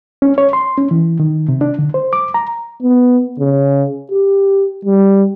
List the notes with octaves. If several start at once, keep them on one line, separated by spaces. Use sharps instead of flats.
C#4
C#5
C6
C#4
E3
D#3
C3
D4
D3
C5
D6
A#5
B3
C#3
G4
G3